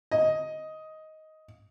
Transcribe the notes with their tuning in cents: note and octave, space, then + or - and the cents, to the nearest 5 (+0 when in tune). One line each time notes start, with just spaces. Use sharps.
D#5 +10